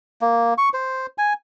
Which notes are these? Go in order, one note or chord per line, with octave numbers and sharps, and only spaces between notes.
A#3
C#6
C5
G#5